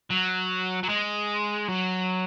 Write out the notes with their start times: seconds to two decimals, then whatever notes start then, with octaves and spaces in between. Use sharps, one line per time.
0.11 F#3
0.83 F#3
0.89 G#3
1.68 F#3